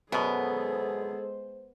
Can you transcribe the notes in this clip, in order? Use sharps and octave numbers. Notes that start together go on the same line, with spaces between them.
F#2 B2 G#3 B3 G#4 A4 C5